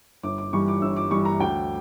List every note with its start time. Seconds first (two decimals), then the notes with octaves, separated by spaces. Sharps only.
0.23 G1 D6
0.38 D6
0.53 G2 E3 G3 C#6
0.68 D6
0.82 G1 E6
0.96 D6
1.11 G2 E3 G3 C#6
1.25 A#5
1.40 D2 G5